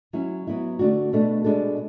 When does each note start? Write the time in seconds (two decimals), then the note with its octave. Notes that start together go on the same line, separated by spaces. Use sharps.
0.13 F#3 C#4 E4
0.47 F#3 B3 E4
0.79 D3 A3 D4 F#4
1.13 B2 A3 D4 A4
1.44 B2 G#3 D4 A4